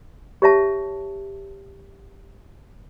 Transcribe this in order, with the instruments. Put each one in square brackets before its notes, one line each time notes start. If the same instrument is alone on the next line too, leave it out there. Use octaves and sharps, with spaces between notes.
[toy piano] G4 C#5 E5 A5